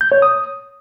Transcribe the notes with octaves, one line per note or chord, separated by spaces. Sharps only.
G6
C#5
D#6